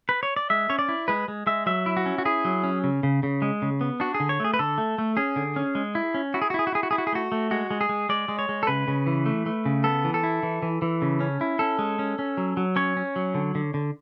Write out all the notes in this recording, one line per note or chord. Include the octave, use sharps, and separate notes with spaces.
B4
C#5
D5
G#3 E5
C#4 C#5
D5
E4
G#3 B4
G#3
G#3 E5
F#3 E5
E4
F#4
C#4
F#4
E4 G#4
F#3
C#4
C#3
C#3
C#3
G#3
C#3
B3
D4 F#4
G#4
D3
C#5
A3 G#4
B4
D3 A4
A3
A3
C#4 G#4
D3
C#4
G#3
E4
C#4
E4 F#4
G#4
F#4
E4 G#4
F#4
E4 G#4
F#4
E4 G#4
F#4
G#4
A3 F#4
A3
G#3 F#4
G#3
G#4
G#3
G#3 D5
G#3
C#5
G#3
A4
C#3 B4
C#3
E3
A3
A3
C#3
B3 A4
E3
A4
E4
E3
E3
E3
C#3
C#4
E4
C#4 A4
G#3
C#4
C#4
F#3
F#3
C#4 C#5
C#4
F#3
D3
D3
D3